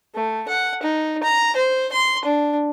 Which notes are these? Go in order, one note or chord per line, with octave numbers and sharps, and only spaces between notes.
A3
F#5
D#4
A#5
C5
C6
D4